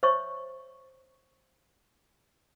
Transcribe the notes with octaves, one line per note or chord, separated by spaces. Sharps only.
C5 C#5 E5 C#6